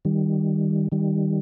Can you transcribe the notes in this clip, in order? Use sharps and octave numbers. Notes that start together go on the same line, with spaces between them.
D#3 G3
D#3 G3